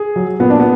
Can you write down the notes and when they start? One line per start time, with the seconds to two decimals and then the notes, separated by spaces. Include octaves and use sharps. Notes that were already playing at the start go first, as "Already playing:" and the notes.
Already playing: G#4
0.16 F#3
0.40 A#2 B3
0.50 D4
0.60 B3